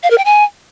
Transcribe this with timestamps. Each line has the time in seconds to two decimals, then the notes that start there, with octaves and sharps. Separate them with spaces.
0.03 F5
0.10 A#4
0.18 G5
0.25 G#5